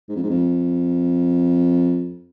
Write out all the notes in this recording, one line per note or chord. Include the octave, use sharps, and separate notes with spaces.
G#2
F2
G#2
F2